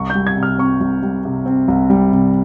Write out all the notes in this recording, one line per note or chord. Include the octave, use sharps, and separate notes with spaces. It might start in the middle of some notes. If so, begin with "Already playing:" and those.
Already playing: C2 C#6
G3 G6
G#6
C3
F6
C4 C#6
C2
G3
C3
C4
C2
G3
C3